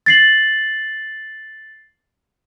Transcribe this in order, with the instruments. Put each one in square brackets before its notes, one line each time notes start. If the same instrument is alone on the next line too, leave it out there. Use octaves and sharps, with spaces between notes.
[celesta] A6 C7 F#7